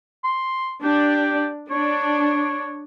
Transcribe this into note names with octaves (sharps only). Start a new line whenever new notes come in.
C6
D4 G4
D4 C#5